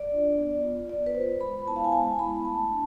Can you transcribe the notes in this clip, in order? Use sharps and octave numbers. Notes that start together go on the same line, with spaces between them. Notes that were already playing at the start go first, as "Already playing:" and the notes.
Already playing: D5
D4 F4
B3
F4
B3 D5
B4
F4 C5
G#3 B5
B3 E4 A5
F5
G#5
G#3 A5
B3 E4 B5
A3 A5
D4